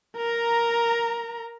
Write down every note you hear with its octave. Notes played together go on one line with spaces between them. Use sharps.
A#4 A#5